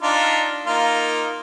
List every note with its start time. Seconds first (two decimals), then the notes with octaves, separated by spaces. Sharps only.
0.02 D4 D#4 F4
0.67 A#3 D#4 F4